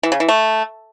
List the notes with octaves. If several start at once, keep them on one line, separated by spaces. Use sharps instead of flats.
E3
C#3
E3
A3